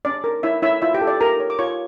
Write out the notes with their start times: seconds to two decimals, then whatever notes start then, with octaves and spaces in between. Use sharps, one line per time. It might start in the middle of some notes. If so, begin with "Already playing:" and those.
0.05 C#4 D5
0.24 A#4
0.43 E4 C#5 E5
0.62 E4 C#5 E5
0.82 E4 F4 E5
0.94 G4 G5
1.01 A4
1.07 D5
1.20 G4 A#4 A#5
1.40 C#5
1.50 D6
1.59 F4 C#5 C#6